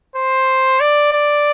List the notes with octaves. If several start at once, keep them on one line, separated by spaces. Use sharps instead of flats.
C5
D5
D5